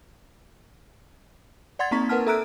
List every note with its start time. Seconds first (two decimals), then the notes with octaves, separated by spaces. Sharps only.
1.79 D5 F#5 C6 G#6 A6
1.91 A#3 C4 D#4 A#5 C#6 B6
2.09 A#4 B4 F#5 A5 F6
2.27 A4 E5 A#5 E6 F#6 D7